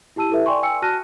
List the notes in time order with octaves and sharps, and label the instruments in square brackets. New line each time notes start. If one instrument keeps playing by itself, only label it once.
[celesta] E4 G4 A5 E6 D#7
E4 G4 A4 B4 E5
D5 G5 G#5 C6 C#6
G5 G#5 E6 C#7
F#4 A5 F6 F#6 A#6 D#7